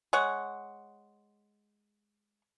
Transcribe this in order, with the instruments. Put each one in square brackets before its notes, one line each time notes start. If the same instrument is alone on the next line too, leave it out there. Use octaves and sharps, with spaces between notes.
[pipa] G#3 C#5 F#5